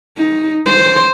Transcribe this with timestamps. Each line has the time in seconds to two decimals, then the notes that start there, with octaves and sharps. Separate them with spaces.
0.17 D#4
0.66 C5